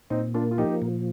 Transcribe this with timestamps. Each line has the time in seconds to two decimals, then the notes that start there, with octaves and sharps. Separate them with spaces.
0.10 A#2 C4 D#4
0.34 A#3 D4 F4
0.51 F4
0.58 F3 D#4 G4
0.82 A#2